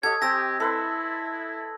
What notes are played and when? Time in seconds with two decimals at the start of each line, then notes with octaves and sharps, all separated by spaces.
0.03 F#4 G4 A4 C#5 D#5 G#6
0.22 C4 G4 G#5 E6 A#6
0.60 E4 A4 B4 C6